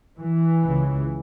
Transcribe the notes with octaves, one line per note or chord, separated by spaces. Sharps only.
E3
C#2 C#3